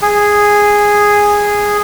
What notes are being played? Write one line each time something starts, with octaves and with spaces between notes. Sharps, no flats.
G#4